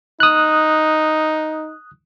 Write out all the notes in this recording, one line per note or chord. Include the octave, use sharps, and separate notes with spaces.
D#4 D#6 F#6